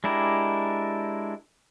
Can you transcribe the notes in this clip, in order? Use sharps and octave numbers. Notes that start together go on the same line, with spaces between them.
G#3 D4 E4 G4 A#4